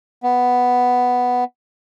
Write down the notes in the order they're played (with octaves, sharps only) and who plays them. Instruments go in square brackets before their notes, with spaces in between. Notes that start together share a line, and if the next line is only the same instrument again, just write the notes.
[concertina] B3